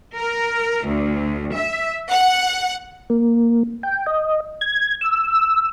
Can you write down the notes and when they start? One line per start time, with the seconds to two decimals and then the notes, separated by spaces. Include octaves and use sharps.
0.15 A#4
0.83 D2
1.54 E5
2.11 F#5
3.10 A#3
3.83 G5
4.06 D#5
4.61 G#6
5.01 E6